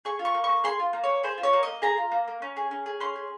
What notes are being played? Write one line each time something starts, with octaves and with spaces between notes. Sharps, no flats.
G#4 C#6
F4
C#6
A#3
C#6
A#3
G#4 C6
F4
A#3
C#5
A#3
G#4 C5
F4
C#5
A#3
D#5
A#3
G#4 A#5
F4
A#3
A#3
C#4
G#4
C#4
G#4
C#4 C6
G#4